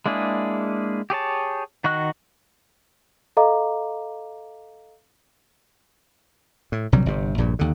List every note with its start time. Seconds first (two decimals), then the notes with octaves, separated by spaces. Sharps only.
0.06 G#3 A#3 D4 E4 G#4
1.10 G4 G#4 C#5 A5
1.84 D#3 F#4 D#5 C#6 F#6
3.37 A4 D#5 F5 A#5 D6
6.72 A2
6.92 A#1 C3 F#3 G3
7.06 G1 C3
7.38 A#1 G2 A#2
7.59 D#2 D3